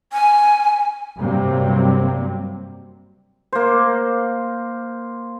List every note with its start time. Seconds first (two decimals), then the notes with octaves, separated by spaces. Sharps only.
0.13 G#5
1.18 G2 C3 F#3 G3 A#3 C4
3.53 A#3 C5